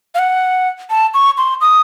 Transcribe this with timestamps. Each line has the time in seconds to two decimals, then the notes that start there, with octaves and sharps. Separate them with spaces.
0.15 F5
0.19 F#5
0.90 A5
1.14 C#6
1.38 C6
1.61 D#6